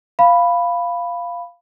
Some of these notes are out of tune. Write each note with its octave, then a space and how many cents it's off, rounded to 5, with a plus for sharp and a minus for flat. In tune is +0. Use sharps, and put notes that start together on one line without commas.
F5 -5 B5 +0